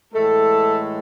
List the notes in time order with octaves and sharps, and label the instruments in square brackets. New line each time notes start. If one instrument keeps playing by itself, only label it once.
[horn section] A2 E3 G#3 A3 A4